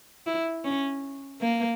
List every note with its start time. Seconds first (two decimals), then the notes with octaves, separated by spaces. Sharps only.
0.27 E4
0.64 C#4
1.41 A#3